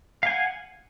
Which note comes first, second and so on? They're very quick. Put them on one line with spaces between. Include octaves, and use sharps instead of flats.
F5 G#5 F#5